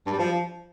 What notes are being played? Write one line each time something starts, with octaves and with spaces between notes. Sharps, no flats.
G2
G3
F3